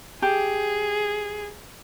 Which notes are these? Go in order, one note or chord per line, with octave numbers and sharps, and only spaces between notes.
G4 G#4